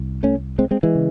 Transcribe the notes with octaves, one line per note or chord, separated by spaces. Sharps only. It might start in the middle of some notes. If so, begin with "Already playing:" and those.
Already playing: C2
A3 C#4
G#3 C4
G#3 C4
E3 G#3
C#3